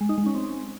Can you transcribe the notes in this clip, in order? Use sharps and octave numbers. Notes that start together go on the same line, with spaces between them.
G#3
D#4
G#3
C#4
C4